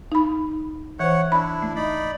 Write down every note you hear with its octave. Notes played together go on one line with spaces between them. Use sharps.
D#4 B5
E3 C5 C#5 F#5
D4 E4 B5
A3
D#4 D5 B5